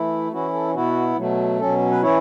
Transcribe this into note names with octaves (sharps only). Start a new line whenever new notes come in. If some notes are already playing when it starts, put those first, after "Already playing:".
Already playing: E3 A3 E4
E3 C#4 E4 F#4
A4
B2 B3 E4 F#4
B2 F#3 A3
B2 F#3 C#4 A4
B4
E3 C#4 E4 C#5